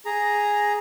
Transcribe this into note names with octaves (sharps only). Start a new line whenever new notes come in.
G#4 A#5